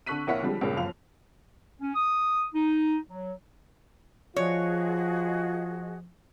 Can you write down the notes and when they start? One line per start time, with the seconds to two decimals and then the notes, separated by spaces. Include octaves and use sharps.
0.06 D3 A4 C#6 F#6 B6 D#7
0.27 A#1 A#3 E4 C#5 F#5 B6
0.42 D3 F3 G3 G#3
0.61 C#2 G2 A#2 C#3 A#3 C#4
0.77 G1 F#2 F3 F5 F7
1.81 C#4
1.95 D#6
2.54 D#4
3.10 F#3
4.36 F3 F4 F#4 G#4 C#5 D#5